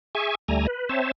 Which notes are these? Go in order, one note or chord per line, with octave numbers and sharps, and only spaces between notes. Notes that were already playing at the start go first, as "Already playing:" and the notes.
G#4 E5 G#5 C#6
D2 G3 A3 G#5 A#5
B4
C4 C5 C#5 E5 A5